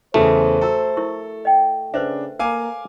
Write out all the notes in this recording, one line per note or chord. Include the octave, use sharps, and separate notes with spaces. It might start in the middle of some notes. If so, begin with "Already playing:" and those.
E2 C#3 E3 A3 C5
F#4 A4 A#5 E6
E4 A#4 C#6
D#5 G5
C#3 D4 B4 C5 E5
A#3 A#4 F5 G#5 A#5 D6